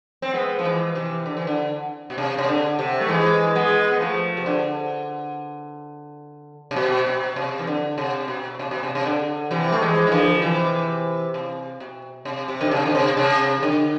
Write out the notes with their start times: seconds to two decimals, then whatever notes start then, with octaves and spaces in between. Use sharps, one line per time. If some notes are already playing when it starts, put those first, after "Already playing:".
0.22 C4
0.33 G#3 B3
0.59 F3
0.64 E3 G#3
0.95 C3 E3
1.26 D3
1.37 E3
1.47 D3
2.10 B2
2.18 C3
2.38 C3
2.49 D3
2.79 C3
3.01 A3
3.08 E3 G#3
3.55 G#3 B3
3.91 B3
4.00 F3 A3
4.37 C3
4.46 D3
6.71 C3
6.76 B2
7.06 B2
7.36 C3
7.59 E3
7.67 D3
7.98 C3
8.28 B2
8.59 C3
8.71 B2
8.83 C3
8.95 C3
9.05 D3
9.51 C3 E3
9.72 A3
9.82 E3 G#3
10.07 E3
10.12 D3 F3
10.42 C3 E3
11.34 C3
11.80 B2
12.25 C3
12.48 C3
12.61 D3
12.71 C3
12.85 D3
12.95 C3
13.17 C3
13.63 D3